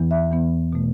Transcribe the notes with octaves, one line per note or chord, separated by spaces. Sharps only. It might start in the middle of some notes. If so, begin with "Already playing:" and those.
Already playing: E2 E3 B3
E5
E2 E3 B3
B2 A3